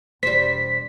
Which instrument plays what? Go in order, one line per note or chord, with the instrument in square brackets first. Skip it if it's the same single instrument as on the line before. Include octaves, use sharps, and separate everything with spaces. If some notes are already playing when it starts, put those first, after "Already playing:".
[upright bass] E1 [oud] G3 C5 [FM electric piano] B6